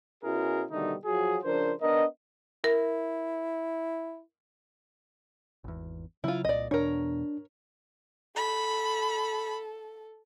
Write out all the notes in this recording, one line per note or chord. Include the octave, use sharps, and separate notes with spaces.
B2 C#4 E4 F#4 G#4 A#4
B2 D3 D#3 G3 A3 D#4
F3 F#3 F4 F#4 G#4
C#3 F3 D4 A#4 C5
B3 D4 A#4 D#5
E4 A#4
G#1 E2
C#3 F#3 E4 F4
C2 A#2 D5 D#5
E2 B2 D4 A#4 C#5
A4 B5